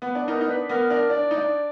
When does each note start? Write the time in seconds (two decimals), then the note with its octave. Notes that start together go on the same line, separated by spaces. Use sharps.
0.02 B3
0.15 D4
0.28 B3 D#4 A#4
0.41 D#4
0.49 D4 B4
0.69 B3 A#4
0.90 D4 A#4
1.10 D4 D5
1.31 D#4
1.37 D4